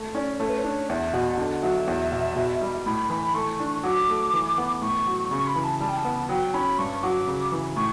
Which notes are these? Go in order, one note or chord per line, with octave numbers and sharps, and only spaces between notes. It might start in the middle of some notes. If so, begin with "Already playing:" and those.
Already playing: A3
C#4 D5
A3 C#5
B4
C#5
D4
E2 E5
B2 F#5
D3
F#3 E5
E2
B2
B2
G3
A2 B5
E3 B5
A3 C#6
D4
F#3 D6
A3
E3
B3
A2 C#6
F#3
C#3 C#6
B5
E3
A5
G3 A5
G5
A5
B3
F#3 G5
C#4 B5
G2 C#6
F#3 D6
C#3
E3
A2 C#6